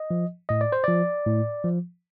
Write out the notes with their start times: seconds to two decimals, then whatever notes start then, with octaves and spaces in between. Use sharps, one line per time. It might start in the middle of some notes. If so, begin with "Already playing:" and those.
Already playing: D#5
0.11 F3
0.49 A2 D#5
0.61 D5
0.72 C5
0.84 F3 D5
1.27 A2
1.64 F3